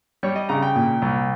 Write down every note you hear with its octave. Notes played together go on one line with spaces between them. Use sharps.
G3 C#5
D#5
C#3 A#5
G5
A#2
C2